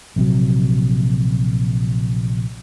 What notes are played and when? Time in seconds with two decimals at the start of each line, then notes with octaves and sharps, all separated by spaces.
0.16 A#1 C3 F#3